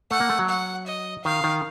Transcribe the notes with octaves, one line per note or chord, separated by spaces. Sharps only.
A3 F#5
A#3
A3
F#3
F#5
D#5
D#3 F5
D#3